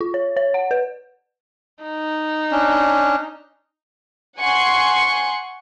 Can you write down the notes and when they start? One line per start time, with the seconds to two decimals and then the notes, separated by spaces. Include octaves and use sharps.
0.01 F4
0.14 C#5
0.37 C#5
0.54 F#5
0.71 B4
1.83 D#4
2.51 C#4 D4
4.39 F#5 G#5 C6 C#6